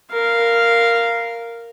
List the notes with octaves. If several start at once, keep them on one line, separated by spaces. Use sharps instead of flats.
A#4 F5